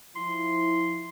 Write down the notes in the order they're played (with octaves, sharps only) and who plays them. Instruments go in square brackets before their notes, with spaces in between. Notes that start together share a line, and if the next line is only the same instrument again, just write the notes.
[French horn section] F3 E4 [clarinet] C6